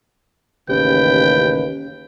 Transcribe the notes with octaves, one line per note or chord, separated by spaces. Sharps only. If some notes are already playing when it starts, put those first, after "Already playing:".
A1 D#2 C#3 C#4 G4 B4 G5